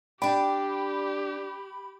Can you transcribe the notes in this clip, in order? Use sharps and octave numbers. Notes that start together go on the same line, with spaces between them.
D4 G4 D5 G5 B5